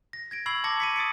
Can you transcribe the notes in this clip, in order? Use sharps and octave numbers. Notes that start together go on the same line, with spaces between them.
A#6
G#6 A#6 D7
B5 C#6 E6 G#6 C7 F#7
A5 D6 G#6 A#6 C#7
B6 C#7 D#7
D#6 A6 C#7 D7